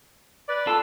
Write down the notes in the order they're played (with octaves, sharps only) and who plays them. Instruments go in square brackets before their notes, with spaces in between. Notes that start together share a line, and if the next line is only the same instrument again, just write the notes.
[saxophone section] B4 D5
[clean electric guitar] F4 A4